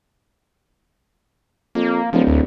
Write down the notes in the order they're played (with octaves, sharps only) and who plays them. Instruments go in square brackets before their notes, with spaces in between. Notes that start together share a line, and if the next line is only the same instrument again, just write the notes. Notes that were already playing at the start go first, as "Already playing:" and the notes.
[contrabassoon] F2 [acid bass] A#3
[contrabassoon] D1 [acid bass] F3
[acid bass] D2